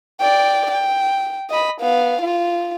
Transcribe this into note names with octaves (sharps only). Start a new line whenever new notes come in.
D5 G5
G5
D#5 B5
B3 F5
F4